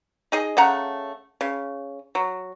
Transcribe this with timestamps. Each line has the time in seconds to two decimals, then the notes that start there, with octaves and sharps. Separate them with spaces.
0.32 D#4 G#4 D#5
0.57 C#3 A3 F#5 A#5
1.41 C#3
2.15 F#3